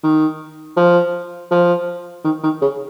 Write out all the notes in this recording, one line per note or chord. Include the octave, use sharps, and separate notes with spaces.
D#3
F3
F3
D#3
D#3
C#3